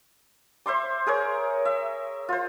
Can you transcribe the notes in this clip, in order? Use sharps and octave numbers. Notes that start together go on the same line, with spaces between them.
C5 E5 C6 D6
G#4 A#4 C#5
E5
F4 C5